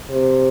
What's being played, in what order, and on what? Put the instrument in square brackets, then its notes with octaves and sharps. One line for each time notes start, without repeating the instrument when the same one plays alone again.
[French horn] C3